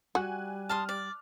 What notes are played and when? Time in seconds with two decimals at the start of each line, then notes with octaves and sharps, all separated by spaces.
0.15 G3 F#4 G#5 F#6
0.69 A5 C6 D#6 F6
0.89 D5